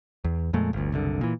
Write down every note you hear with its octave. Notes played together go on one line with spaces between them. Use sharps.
E2
F2 A#2 G#3 A3
G1 D2
F#1 C2 D3
A#2 E3